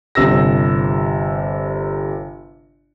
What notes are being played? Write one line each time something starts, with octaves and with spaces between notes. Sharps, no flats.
G1 C3 E6 A#6